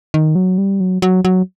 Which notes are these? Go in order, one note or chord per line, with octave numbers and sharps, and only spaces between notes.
D#3
F#3
G3
F#3
F#3
F#3